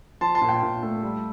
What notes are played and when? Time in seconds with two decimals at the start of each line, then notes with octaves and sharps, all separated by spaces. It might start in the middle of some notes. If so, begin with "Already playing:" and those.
0.21 F3 A5 C6
0.35 A5 C6
0.42 A#2
0.49 G5
0.63 A#2
0.83 A3
1.03 G3